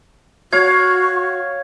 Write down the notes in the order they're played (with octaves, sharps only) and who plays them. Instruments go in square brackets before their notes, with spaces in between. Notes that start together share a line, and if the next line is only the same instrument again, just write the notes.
[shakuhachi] F#4 [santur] C#5 F5 [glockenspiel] G#6